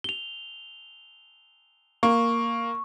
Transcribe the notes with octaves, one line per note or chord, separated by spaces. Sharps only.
F7 G7
A#3 C#6